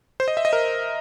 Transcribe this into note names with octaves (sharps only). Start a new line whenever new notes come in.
C5
D#5
E5
D#5
A#4